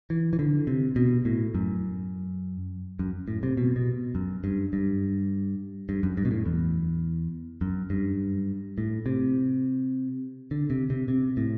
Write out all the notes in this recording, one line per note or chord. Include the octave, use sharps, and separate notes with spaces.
E3
E3
D3
C3
B2
A2
F#2
F#2
A2
C3
B2
B2
F#2
G2
G2
G2
F#2
G2
B2
A2
E2
F#2
G2
A2
C3
D3
C3
C3
C3
A2